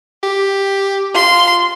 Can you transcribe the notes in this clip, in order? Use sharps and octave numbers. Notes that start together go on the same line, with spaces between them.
G4
F4 C6